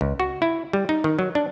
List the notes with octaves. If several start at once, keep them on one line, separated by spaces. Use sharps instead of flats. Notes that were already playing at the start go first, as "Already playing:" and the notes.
C#2
F#4
E4
G3
D#4
D#3
F#3
D4